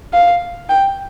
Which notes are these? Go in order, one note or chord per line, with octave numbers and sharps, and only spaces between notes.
F5
G5